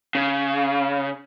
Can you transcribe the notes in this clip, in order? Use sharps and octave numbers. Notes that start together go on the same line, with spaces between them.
C#3